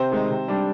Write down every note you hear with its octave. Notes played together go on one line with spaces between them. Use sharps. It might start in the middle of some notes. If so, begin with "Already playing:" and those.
Already playing: C3 C5
D#3 G#3 D#4
C3
G3 D4